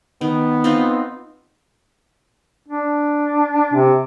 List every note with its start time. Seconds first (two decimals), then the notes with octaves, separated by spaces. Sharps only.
0.21 D#3 B3
0.64 C4 D#4 F4
2.69 D4
3.74 C3